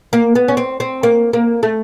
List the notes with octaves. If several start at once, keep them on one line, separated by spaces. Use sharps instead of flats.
A#3
B3
C#4
C4
C4
A#3
A#3
A3